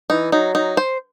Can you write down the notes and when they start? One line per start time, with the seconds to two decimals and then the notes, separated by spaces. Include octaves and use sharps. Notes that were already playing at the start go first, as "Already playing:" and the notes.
0.10 E3 D#4
0.32 F#3 D#4
0.55 F#3 D#4
0.77 C5